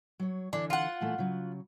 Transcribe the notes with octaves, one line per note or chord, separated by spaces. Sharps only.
F#3 C#5
D3 E3 D4
F4 F#5
A#2 E3 A3
C#3 F#3